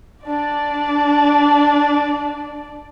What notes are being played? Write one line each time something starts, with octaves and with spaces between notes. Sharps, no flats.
D4 D5